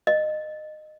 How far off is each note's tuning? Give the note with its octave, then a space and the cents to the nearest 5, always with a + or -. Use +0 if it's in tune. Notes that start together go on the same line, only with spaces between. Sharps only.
D#5 -20